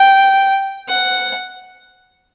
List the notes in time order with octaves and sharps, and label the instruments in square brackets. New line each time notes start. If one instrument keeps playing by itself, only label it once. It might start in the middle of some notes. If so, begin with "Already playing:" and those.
Already playing: [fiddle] G5
F#5